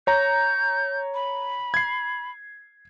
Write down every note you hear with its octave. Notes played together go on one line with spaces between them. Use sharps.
C#5 A#5 G6
B5
G#6 C7